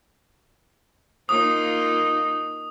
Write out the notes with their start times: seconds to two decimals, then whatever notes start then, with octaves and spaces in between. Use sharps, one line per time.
1.29 A#3 D#4 F4 D#6